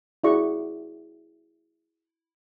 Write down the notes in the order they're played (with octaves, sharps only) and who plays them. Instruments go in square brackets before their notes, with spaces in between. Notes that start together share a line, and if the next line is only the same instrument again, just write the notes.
[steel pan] E4 F#4 G#4 D5 F#5 C#6